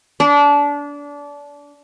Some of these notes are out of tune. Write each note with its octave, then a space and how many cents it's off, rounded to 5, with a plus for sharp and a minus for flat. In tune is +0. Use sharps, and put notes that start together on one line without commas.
D4 -25